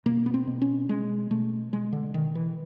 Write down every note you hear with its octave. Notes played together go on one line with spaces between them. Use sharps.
B2 A#3
B3
C4
B2
C#4
B2 G#3
B2 A3
B2 G#3
D3
B2 D#3
E3